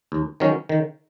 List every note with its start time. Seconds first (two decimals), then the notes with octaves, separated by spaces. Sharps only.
0.12 D#2
0.40 D#3 F#3 C#4
0.69 D#3